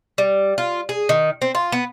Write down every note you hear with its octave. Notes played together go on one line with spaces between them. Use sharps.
G3
F4
G#4
D#3
C4
F4
B3